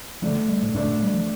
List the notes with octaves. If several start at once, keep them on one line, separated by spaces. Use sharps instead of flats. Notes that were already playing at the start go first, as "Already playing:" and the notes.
D3 F3 A3 D4
G3
A2
G2 D3 A3 D4
A#2
G3
F3